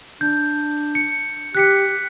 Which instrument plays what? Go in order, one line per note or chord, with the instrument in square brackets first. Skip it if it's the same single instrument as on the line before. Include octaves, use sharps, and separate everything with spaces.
[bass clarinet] D4 [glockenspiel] G6
[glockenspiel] C#7
[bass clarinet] G4 [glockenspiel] F#6 B6 C#7